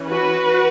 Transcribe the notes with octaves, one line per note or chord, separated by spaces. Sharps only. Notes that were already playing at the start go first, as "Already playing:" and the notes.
Already playing: E3 C#4
F#4 B4